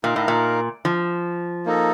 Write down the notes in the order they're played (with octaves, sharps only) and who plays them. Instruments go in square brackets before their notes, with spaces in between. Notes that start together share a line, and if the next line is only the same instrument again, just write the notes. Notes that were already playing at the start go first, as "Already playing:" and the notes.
[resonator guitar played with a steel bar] A#2 [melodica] D#4 A#4 F5
[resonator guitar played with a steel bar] A2
A#2
F3
[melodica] A#3 D#4 A4 D#5